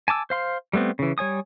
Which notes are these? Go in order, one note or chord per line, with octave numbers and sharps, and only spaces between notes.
G#5 A5 D6 E6
C5 F5 C6
G3 A3 B3 C4
C#3 E3
G3 C#5 G#5 D#6